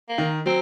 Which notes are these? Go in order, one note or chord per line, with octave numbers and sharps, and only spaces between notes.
A#3
D#3
F#3 C4